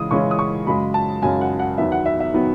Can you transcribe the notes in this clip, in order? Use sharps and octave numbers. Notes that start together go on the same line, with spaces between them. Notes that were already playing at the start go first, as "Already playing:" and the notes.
Already playing: C#3 E3 G#3 D#6
C#3 E3 G#3 C#4 E4 C#6
D#6
C#6
F#2 C#3 G#3 B5
A5
F#2 C#3 G#3 G#5
F#5
F#5
E2 D#3 F#3 B3 E5
F#5
E5
E5
D#3 F#3 B3